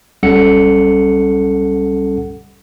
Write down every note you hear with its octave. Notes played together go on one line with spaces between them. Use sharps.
C2 G3 C#4 A4 F#5 C#7